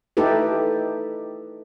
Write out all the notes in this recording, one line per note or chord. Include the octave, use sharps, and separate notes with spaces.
A3 D#4 E4 G4 A4 B4